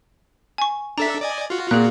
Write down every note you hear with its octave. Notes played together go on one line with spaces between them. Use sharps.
G#5 C#6
D4 A4 E5 A#5 B6
D5 D#5 G#5
F4 F#4
A#2 G#4 F#6